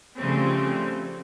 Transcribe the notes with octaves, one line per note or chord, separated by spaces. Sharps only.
C#3 F3 G3 A3 C4 C#4